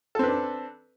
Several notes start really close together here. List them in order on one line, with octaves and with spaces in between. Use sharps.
A4 C4 B4 D4